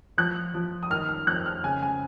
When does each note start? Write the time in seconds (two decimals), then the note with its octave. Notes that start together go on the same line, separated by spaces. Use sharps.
0.18 F3 F#6
0.54 F3
0.83 D#6
0.90 D#3 F6
1.09 F6
1.27 F2 F#6
1.46 F6
1.63 C#3 G#5
1.82 G#5